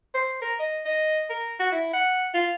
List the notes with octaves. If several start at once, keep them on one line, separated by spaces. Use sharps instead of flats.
C5
A#4
D#5
D#5
A#4
F#4
E4
F#5
F4